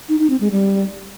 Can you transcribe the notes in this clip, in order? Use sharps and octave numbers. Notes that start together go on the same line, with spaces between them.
D#4
D#4
C4
G#3
G3